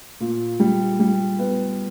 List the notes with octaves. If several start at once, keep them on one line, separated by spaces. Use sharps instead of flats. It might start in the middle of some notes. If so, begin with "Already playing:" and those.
A#2
G3
G3
B3